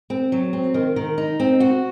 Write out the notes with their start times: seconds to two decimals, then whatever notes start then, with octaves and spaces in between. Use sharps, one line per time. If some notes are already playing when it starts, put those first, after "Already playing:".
0.10 C4
0.32 F#3
0.53 C4
0.74 D#3
0.96 D#3
1.18 D#4
1.40 C4
1.60 F#4